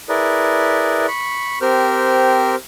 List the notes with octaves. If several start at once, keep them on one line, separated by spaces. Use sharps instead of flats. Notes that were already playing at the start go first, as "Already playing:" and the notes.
E4 G#4 A#4 B4 D5
B5 C#6
C4 G4 A#4 C5 G5 F6